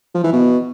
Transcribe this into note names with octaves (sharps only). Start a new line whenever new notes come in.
F3
E3
B2